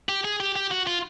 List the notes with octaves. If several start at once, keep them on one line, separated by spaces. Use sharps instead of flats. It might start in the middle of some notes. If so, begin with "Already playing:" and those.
G4
G#4
G4
G4
F#4
F4